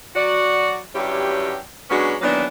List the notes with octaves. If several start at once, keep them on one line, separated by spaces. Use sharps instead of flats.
F#3 F#4 D5
G2 F#3 C#4 E4 G4
F#3 G#3 B3 C#4 D4 F#4
D#3 E3 F#3 A#3 B3 D4